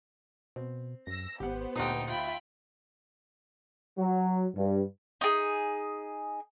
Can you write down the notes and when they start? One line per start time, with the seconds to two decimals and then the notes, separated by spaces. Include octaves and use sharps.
0.56 B2 C4
1.07 F#2 E6 A#6
1.40 G#1 B3 G4 C5 F#5
1.76 D2 A#2 D#4 G4 G5 D#6
2.07 F4 E5 G5 B5
3.98 F#3
4.56 G2
5.21 D#4 G#4